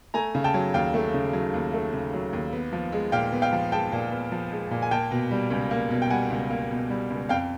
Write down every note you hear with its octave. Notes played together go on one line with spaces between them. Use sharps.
A3 G#5 A#5
C#3
G5 A5
F#3
D#2 F5 G5
A3
C#3
F#3
D#2
A3
C#3
F#3
D#2
B3
F3
G#3
A#2 F5 G5
B3
F5 G5
F3
G#3 G5 A5
A#2
B3
F3
G#3
A#2
G#5
A#3 G5 A5
B2
G3
C#2
A#3
B2
G5
G3 F#5 G#5
C#2
A#3
B2
G3
C#2
F2 F5 G5